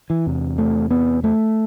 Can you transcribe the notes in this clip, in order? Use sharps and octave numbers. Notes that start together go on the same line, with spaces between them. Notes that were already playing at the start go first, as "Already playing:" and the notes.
E3
E2 C3
A3
B3
A3